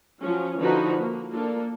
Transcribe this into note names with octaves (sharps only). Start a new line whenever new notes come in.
F3 F#3 C#4
D3 E3 F3 D#4 F#4 B4
A#3
A#3 D4 F4 A4